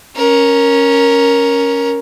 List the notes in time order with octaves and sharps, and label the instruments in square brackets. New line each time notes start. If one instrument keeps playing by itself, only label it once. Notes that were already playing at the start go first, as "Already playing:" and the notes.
[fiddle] C#4 A#4